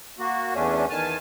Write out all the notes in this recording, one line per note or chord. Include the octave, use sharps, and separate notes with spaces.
A#3 F#4
E2 A3 C#4 D4
E2 D#3 G#5 A5 F6